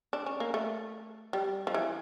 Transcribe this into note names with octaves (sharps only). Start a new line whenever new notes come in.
D4
C#4
A#3
A3
G3
F3
E3